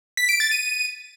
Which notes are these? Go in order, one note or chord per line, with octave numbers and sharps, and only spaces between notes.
B6
D7
A6
D#7